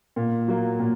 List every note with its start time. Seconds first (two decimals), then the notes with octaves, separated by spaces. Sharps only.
0.16 A#2
0.48 F#3 A#3
0.80 A#2